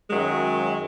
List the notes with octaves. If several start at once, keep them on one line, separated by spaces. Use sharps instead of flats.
F#2 D#3 F#3 G#3